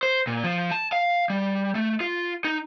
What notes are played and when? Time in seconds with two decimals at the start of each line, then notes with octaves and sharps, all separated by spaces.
0.03 C5
0.27 A#2
0.44 F3
0.71 A5
0.92 F5
1.30 G3
1.75 A3
2.01 F4
2.45 D#4